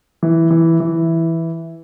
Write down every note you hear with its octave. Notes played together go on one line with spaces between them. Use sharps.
E3
E3
E3